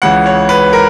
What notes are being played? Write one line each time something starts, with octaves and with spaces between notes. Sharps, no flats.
C#2 C#3 E3 F#5
C#5
B4
A#4